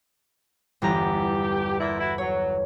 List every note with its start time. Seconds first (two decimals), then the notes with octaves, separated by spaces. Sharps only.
0.82 G1 E2 G4 A#5
1.79 A#2 E4
1.99 E4 F#4
2.18 F#3 C#5